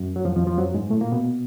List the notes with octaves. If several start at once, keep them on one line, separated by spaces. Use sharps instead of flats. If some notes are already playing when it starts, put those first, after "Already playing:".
Already playing: F#2
F#3
F2 F3
F2 F3
F2 F3
F#2 F#3
G#2 G#3
A2 A3
A#2 A#3
B2 B3